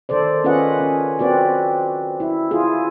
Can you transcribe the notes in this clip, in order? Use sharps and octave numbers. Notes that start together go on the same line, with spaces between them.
D#3 A4 C5 D5
C#4 F4 G#4 B4 D#5 F#5
C#4
C4 F#4 B4 D5
E4
E4 F4 G#4